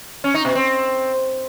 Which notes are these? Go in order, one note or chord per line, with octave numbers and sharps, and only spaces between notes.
C#4
D#4
B2
C4